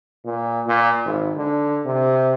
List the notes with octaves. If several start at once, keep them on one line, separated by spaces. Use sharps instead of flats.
A#2
A#2
G#1
D3
C3